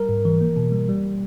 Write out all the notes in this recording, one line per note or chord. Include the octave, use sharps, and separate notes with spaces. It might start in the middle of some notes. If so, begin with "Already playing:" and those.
Already playing: G3 A#4
G#2
E3
A#3
B2
G3
G3